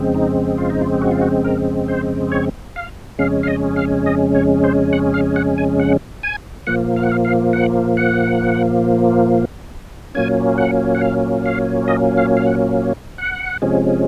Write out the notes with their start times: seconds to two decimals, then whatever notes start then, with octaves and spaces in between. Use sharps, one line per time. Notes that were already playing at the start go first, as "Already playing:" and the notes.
Already playing: F2 C#3 G#3 C4
0.15 D#4
0.58 F4
0.70 D#4
0.81 F4
1.02 F#4
1.11 F4
1.22 F#4
1.44 A#4
1.88 C5
2.32 C#5
2.76 F5
3.18 F2 C#3 G#3 C#4 F5
3.43 F5
3.47 D#5
3.76 F5
4.06 D#5
4.35 C#5
4.64 C5
4.93 F#5
5.14 F5
5.36 F#5
5.58 G#5
5.79 F#5
6.23 G#5
6.67 A#2 F3 A#3 F#5
6.96 F5
7.03 F#5
7.12 F5
7.25 F5
7.53 F#5
7.97 F#5
10.15 A#2 F#3 A#3 C#4 G#5
10.58 F#5
10.95 F#5
11.01 F5
11.46 F5
11.88 D#5
12.17 F5
12.37 F5
12.46 F#5
13.18 F#5
13.62 C3 F3 G#3 C#4